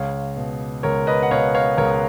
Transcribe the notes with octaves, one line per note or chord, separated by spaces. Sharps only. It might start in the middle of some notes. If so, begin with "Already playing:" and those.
Already playing: C#2 C#5 F5
B2
C#2 A#4 C#5
B4 D#5
F#5
B2 C#5 F5
C#5 F5
C#2 A#4 C#5